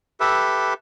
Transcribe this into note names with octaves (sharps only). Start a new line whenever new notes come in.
G4 A4 B4 E5